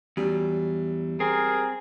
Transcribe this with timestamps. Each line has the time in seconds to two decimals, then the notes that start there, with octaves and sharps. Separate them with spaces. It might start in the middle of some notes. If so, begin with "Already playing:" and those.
0.17 E2 F#3 G3
1.20 C4 G#4 A#4